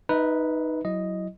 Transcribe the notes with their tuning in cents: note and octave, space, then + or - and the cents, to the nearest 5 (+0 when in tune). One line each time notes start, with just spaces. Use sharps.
D#4 +0 B4 -5 E5 -35
F#3 +10 E4 +0 D#5 +0